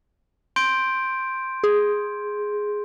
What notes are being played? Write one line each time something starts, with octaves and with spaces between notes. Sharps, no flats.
C6 G6 D7
G#4